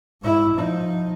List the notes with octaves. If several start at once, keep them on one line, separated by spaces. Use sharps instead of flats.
G#2 E4
F3 D#4